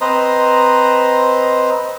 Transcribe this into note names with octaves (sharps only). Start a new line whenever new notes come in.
C4 B4 C5 D#5 A#5